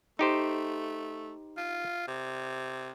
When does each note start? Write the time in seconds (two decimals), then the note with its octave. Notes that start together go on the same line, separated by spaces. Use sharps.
0.19 A3 D#4 G4 C5
1.57 F4
2.08 C3